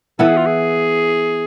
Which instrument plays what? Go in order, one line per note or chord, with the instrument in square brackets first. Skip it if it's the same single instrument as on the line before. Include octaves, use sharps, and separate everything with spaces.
[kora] E3 B3 E4 [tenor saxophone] A4
[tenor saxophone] G#4
F4
G#4